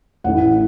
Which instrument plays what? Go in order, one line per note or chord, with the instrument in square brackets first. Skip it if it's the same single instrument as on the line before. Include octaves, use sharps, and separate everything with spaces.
[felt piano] A1 A2 E3 F#5